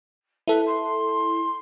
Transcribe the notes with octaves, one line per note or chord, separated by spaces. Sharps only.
E4 A4 B4
C6